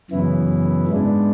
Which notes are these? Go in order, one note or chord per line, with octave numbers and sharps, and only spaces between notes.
F#2 C#3 E3 B3 E4
G#2 G#3 B3 D4